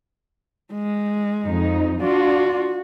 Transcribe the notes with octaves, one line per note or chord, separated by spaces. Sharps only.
G#3
F2 D#4
D4 F4 F#4